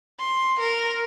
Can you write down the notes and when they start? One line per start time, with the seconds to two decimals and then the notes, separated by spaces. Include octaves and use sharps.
0.19 C6
0.60 A#4